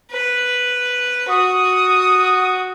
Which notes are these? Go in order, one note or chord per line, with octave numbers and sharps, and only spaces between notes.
B4
F#4 D#6